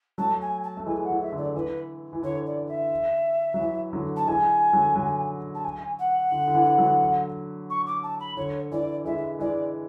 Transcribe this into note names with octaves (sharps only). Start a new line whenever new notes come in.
F#3 A3 A5
G#5
A5
A3
E3 G#3 G#5
F#5
E3
E5
D3
D5
E3 B4
E3
D3 C#5
D5
E5
F#3
E3
D3 F#3
A5
E3 G#3 G#5
D3 F#3
D3 F#3
A5
G#5
F#5
D3
D3
E3
D3 F#3
C#6
D6
A5
B5
D3 C#5
E3 D5
E3 G#3 E5
E3 G#3 D5